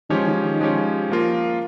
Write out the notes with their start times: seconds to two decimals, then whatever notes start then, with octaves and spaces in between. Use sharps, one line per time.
0.10 D#3 F3 G#3 C#4 G4 C#5
0.27 D#3
0.43 D#3
0.60 F3 G#3 C#4 G4 C#5
1.10 F3 A#3 F4 A#4